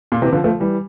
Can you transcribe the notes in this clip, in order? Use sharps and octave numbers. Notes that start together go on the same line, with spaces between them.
A#2
C3 E3
D3 F3
F3 A3
E3 G3